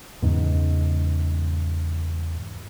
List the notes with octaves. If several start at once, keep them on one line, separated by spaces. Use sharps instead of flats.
E2 G#2 C#3